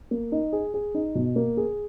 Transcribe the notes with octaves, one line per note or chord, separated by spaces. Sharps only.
A#3
D#4
G#4
G#4
D#4
B2
A#3
G#4